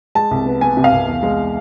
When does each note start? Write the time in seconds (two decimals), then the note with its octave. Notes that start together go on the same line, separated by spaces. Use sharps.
0.15 G#3 A5
0.31 C2
0.46 B3
0.61 B3 G#5
0.77 C3
0.84 F5
0.92 C2
1.08 E2
1.23 G#3